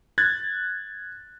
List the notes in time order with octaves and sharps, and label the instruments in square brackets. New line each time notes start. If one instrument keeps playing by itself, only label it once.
[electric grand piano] F#6 G#6 A6